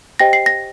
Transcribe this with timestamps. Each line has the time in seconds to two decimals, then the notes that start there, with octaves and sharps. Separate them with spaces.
0.19 G4 C5 D#5 G5 A#6
0.33 C7
0.46 A#6